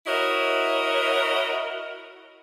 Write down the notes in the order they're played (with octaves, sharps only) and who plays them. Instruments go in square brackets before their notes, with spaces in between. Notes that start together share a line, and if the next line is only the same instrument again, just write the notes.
[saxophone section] E4 F#4 A#4 C#5 D#5